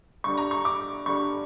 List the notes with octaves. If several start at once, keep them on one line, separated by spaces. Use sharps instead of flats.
G2 D3 G3 C#6
A#5
C#6
D6
G2 D3 G3 C#6